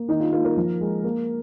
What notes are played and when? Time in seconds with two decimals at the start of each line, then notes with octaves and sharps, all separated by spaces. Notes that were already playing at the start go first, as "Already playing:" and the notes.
Already playing: A#3
0.08 D#3 D#4
0.20 F4
0.33 A#3 F4
0.44 A#4
0.57 F3
0.80 G#3
1.04 A#3